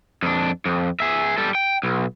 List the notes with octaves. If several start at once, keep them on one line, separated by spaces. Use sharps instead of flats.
F2 D4
F2
G#4 E5
G3 A4
G5
B1